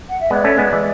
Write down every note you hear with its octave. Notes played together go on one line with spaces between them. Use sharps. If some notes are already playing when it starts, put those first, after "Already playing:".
F#5
E5
G#3 B3 D5
A3 C#4
G#3 B3
E3 G#3